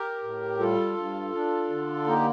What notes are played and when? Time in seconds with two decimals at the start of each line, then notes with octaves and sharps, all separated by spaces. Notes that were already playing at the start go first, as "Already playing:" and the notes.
Already playing: G4 A#4
0.23 A2
0.59 G3 F4 A4
0.97 G2
1.34 D4
1.70 D3
2.06 A#3 D#4 G4